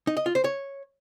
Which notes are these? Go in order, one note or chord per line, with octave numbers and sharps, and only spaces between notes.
D#4
D#5
F4
C5
C#5